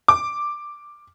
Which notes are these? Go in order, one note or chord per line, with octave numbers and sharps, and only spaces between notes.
D6